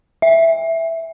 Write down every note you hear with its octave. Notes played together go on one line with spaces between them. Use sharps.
E5